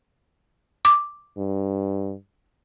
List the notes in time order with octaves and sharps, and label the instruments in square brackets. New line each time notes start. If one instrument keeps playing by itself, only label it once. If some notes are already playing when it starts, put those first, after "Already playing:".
[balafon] D6
[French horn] G2